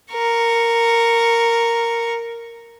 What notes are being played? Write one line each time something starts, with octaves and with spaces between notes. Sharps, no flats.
A#4 C#6